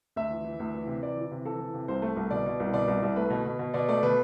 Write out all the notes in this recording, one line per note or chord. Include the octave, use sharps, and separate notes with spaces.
D2 E5
E3
E3
D2
E3
C3
E3 D5
E3
C3
E3 A4
E3
C3
C2 C5
A3
C2
B2 D5
B2
C2
B2 D5
C2
C2
A3 B4
B2
B2
B2
B2 D5
A3 D5
B2 B4